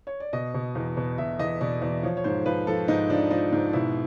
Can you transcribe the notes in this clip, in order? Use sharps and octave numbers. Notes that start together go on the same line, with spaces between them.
C#5
D5
B2 D#5
B2
E2
B2
B2 E5
E2 D#5
B2 D5
E2 D5
F3 C#5
C#5
G#2 C5
F3 B4
F3 A4
G#2 D#4
F3 D4
F3 D#4
G#2
B2 E4